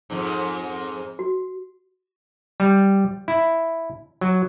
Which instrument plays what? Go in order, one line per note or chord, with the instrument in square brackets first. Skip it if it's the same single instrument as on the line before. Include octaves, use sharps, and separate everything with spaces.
[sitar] F2 G#2
[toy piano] F#4
[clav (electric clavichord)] G3
E4
F#3